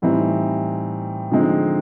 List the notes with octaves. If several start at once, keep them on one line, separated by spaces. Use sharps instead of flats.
A2 E3 G3 C4 D#4
D3 F3 G#3 C4 D#4